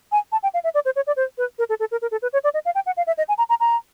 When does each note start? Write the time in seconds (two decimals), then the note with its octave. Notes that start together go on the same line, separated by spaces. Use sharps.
0.12 G#5
0.32 A5
0.43 G5
0.54 F5
0.64 E5
0.74 D5
0.85 C5
0.96 C#5
1.07 D5
1.17 C5
1.38 B4
1.59 A#4
1.69 A4
1.80 A4
1.92 A#4
2.02 A#4
2.11 A4
2.22 B4
2.33 C#5
2.44 D5
2.54 D#5
2.65 F5
2.75 G5
2.86 F#5
2.97 F5
3.07 E5
3.18 D#5
3.28 G#5
3.38 A#5
3.49 A#5
3.60 A#5